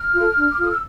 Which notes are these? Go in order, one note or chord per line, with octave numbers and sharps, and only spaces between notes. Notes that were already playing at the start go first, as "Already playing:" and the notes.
Already playing: F6
F4 A4
D4
D6
F4 A4 D#6
E6